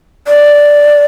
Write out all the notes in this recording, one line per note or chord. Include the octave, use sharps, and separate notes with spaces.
D5